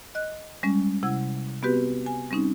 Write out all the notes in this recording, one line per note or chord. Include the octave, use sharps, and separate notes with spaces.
D#5 F#6
G3 G#3 C#4
C3 E4 F#5 E6 G#6
B3 C4 F#4 G4 B4
G#5
G3 C4 C#4 D#4